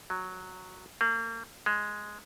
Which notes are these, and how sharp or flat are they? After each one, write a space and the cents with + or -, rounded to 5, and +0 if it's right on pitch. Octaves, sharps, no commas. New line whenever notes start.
F#3 -5
A#3 -35
G#3 +0